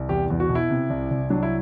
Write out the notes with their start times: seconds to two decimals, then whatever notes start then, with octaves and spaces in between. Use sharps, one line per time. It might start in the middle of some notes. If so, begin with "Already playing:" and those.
Already playing: C2
0.09 E2 G4
0.30 E2
0.40 F#4
0.49 B2
0.55 E4
0.70 C3
0.90 C2
1.10 C2
1.30 F#3 D4
1.43 E4